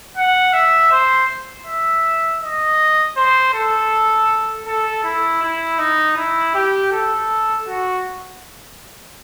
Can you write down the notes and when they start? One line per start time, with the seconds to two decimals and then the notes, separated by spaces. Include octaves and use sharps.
0.17 F#5
0.53 E5
0.92 C5
1.67 E5
2.42 D#5
3.17 C5
3.54 A4
4.66 A4
5.04 E4
5.42 E4
5.79 D#4
6.17 E4
6.55 G4
6.92 A4
7.67 F#4